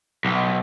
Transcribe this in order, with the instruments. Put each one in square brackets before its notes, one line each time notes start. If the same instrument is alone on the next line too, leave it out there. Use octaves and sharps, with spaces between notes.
[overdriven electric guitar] B1